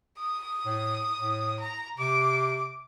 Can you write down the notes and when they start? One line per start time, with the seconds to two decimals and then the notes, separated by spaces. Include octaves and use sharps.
0.19 D#6
0.66 A2
1.17 A2
1.61 A#5
1.98 C3 D6